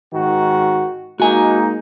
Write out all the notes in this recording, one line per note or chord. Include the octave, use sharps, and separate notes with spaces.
G#2 D#3 F#4
G#3 A#3 D#4 F#4 G#5